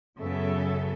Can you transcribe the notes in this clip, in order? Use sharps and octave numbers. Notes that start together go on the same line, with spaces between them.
F#2 C#3 F#3 B3 A4 E5